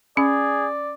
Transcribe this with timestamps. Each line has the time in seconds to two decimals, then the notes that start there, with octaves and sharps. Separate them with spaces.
0.17 C#4 G#4 D5